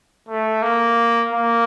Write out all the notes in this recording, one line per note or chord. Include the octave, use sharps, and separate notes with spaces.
A3
A#3
A#3